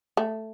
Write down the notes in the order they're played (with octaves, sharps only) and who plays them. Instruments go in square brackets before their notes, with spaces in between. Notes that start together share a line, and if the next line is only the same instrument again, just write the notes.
[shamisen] A3